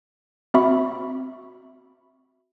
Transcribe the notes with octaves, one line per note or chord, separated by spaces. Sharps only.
C4 F#4 E5 B5 C#6